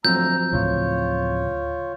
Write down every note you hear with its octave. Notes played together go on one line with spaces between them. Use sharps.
D2 F3 F#3 C4 A#5 E6 G6
D2 A2 C#3 F4 C#5